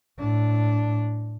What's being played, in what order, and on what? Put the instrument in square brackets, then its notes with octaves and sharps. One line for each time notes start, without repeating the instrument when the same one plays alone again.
[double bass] A2 D4